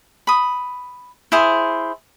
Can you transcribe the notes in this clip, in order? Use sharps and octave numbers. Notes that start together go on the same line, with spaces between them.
B5 D#6
E4 G#4 C5